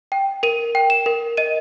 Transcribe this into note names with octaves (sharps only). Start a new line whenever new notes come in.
G5
A#4 D#7
G5
E7
A#4
D#5 D#7